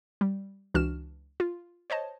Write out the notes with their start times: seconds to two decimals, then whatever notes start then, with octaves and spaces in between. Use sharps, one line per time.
0.21 G3
0.74 C#2 E3 D4 F#4 F6 E7
1.40 F4
1.90 C5 C#5 D#5 A5